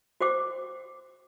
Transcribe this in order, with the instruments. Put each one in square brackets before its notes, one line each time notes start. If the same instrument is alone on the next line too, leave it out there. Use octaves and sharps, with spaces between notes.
[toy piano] F#4 C5 G5 D6